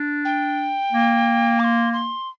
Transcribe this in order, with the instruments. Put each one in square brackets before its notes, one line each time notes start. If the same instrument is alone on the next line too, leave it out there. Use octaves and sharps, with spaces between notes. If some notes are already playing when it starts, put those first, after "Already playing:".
Already playing: [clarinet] D4
[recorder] G5
[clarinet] A#3
[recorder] D6
C6
C6